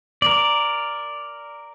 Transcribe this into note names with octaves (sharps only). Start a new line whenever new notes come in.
A#4 D5